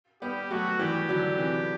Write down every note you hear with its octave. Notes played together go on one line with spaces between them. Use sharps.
G3 B3 G4
F#3 A3 F#4
E3 G3 G4
D3 F#3
C3 E3